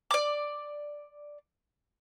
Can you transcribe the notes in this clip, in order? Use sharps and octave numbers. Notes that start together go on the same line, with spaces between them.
D5 D6